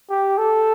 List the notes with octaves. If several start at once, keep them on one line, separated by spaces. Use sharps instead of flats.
G4
A4